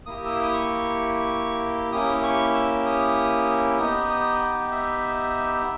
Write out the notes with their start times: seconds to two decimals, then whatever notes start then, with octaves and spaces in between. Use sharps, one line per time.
0.06 A#3 E4 G4 D#6
0.25 E6
0.39 D#6
0.53 C#6
1.92 A#3 C#4 E4 G4 D#6
2.23 C#6
2.54 E6
2.86 D#6
3.78 B3 D#4 G4 D#6
4.09 D#6
4.40 G5
4.71 E5